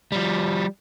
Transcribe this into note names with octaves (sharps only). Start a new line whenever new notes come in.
F3 G3